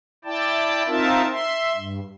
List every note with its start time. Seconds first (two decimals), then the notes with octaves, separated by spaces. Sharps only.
0.25 E4 D5 G5 A5
0.87 C4 D#4 F4 A#4 E5 A5
1.31 E5 C6
1.76 G2